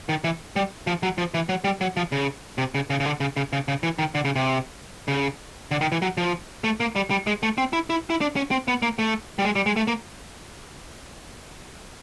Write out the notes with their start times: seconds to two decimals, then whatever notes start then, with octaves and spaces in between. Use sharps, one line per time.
0.09 D#3
0.24 E3
0.56 G3
0.87 F3
1.03 F#3
1.18 F3
1.34 E3
1.49 F#3
1.64 G3
1.81 F#3
1.97 F3
2.12 C#3
2.58 C3
2.75 C#3
2.90 C#3
3.00 C#3
3.06 D3
3.20 C#3
3.37 C#3
3.53 C#3
3.68 C#3
3.83 E3
3.99 D#3
4.15 D3
4.25 C#3
4.36 C3
5.08 C#3
5.71 D3
5.81 D#3
5.92 E3
6.02 F#3
6.17 F3
6.64 A3
6.80 A#3
6.96 G3
7.11 G3
7.27 G#3
7.43 A3
7.58 C4
7.73 E4
7.90 E4
8.10 E4
8.21 D4
8.36 C#4
8.51 C4
8.68 B3
8.82 A#3
8.99 A3
9.39 G3
9.45 G#3
9.56 G3
9.66 G#3
9.76 A3
9.87 A#3